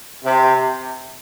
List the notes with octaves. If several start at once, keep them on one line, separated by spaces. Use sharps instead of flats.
C3